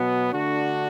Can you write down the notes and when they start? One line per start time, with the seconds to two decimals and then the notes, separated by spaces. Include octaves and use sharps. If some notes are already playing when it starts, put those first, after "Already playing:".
Already playing: B2 F#3 B3
0.32 D3 A3 D4 F#4